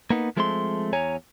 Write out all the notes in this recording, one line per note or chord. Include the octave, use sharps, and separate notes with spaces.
A#3 B3 D#4
F3 G#3 A3 C4 D#5 C6
E2 C#5 G#5 A#5